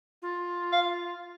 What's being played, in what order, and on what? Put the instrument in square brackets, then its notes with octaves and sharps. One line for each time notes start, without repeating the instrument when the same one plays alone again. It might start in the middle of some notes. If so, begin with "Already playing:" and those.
[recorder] F4
[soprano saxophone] F5